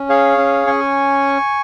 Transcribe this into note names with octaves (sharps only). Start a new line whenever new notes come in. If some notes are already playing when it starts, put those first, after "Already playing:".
Already playing: C#4
G#4 C#5 F5
C#4
C#4 G#5 C#6